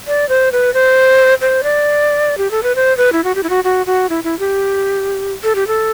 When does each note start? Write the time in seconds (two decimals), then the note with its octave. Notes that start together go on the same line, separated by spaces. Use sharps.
0.07 D5
0.29 C5
0.52 B4
0.74 C5
1.41 C5
1.63 D5
2.38 G4
2.51 A4
2.63 B4
2.76 C5
2.97 B4
3.13 E4
3.24 F#4
3.35 G4
3.43 E4
3.50 F#4
3.64 F#4
3.86 F#4
4.10 E4
4.24 E4
4.39 G4
5.44 A4
5.55 G4
5.67 A4